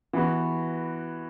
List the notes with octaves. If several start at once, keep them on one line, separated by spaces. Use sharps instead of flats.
E3 B3 F#4